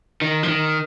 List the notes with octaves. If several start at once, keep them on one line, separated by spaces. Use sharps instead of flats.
D#3
F3
D#3